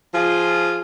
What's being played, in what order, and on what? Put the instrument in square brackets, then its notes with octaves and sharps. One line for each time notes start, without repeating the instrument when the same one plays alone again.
[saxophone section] F3 F4 G#4